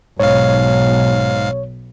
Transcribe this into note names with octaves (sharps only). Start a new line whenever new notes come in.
B1 G#2 C#5 F5